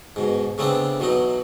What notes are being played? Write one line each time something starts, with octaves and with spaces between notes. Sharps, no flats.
G#2 B2
C#3 A3 B3 C4 D4
B2 E3 F#3 D#4